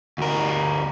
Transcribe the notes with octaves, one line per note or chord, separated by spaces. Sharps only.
D2 A#4